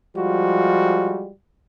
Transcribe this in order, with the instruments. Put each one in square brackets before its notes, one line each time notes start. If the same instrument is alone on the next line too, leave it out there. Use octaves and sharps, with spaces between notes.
[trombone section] F3 G3 G#3 F4 F#4